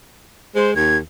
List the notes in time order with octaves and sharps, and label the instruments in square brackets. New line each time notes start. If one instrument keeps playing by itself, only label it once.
[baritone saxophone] G#3 [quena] C5
[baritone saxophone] D#2 [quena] G#6